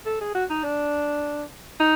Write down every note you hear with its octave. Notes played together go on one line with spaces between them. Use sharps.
A4
G#4
F#4
D#4
D4
D#4